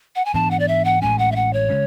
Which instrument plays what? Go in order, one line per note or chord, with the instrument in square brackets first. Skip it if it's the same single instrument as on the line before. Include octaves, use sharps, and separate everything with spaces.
[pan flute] F#5
G#5
[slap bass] G#2 E3 B3 D4 [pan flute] A5
[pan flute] F#5
D5
E5
F#5
[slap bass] A1 A2 G#3 C#4 [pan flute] G#5
[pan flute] F#5
E5
F#5
C#5
[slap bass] C#3 G#3 C#4